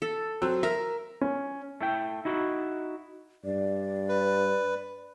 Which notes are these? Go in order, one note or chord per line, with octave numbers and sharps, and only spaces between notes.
A4
F#3 C4 E6
A#4 E5
C#4
A3 E4 G5
D#4 E4 F#4
G2 D5
B4